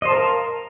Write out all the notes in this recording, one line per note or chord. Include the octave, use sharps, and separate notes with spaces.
A#4 C5 D#5 F5 A5